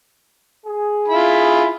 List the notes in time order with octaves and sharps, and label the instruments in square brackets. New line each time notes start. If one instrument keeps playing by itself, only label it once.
[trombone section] G#4
[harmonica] E4 F4 B5